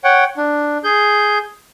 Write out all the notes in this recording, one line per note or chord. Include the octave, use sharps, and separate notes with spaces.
C#5 F#5 G5
D4
G#4 G6